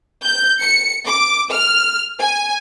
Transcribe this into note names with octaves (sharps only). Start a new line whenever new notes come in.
G6
C#7
D6
F6
G#5